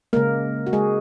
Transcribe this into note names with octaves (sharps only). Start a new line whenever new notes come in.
C#3 G#3 A#3 A#4
F#4
G#3 G#4